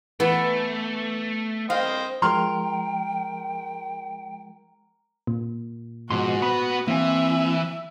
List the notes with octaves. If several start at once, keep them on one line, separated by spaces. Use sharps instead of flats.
E3 A3 B3
C5 D#5 F5 G5
F3 G#3 A#4 G5 A#5 C6 F6
A#2
G#2 B2 F3 F#4 C6
B3 B5
E3 A#3 C4 E5 G#5